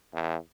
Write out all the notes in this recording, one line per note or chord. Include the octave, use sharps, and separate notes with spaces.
E2